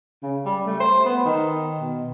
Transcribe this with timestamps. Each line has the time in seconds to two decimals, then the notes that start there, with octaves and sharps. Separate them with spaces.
0.22 C#3
0.45 G3
0.66 A3
0.80 C5
1.05 B3
1.25 D#3
1.80 B2